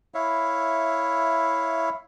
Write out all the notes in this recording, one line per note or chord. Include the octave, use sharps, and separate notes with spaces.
E4 C#5 E5 F5